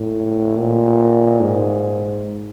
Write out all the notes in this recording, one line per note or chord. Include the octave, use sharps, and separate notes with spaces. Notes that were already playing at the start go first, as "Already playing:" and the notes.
Already playing: A2
A#2
G#2